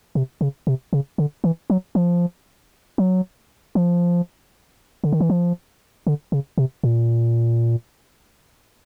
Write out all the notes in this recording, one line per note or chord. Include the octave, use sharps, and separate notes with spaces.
C3
C#3
C3
C#3
D3
E3
F#3
F3
F#3
F3
D3
D#3
E3
F3
D3
C#3
C3
A#2